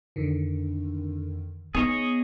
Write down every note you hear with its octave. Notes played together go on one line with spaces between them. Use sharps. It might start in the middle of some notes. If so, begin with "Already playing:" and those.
F2 D3 D#3
B3 D#4 G#4 C#5 D#5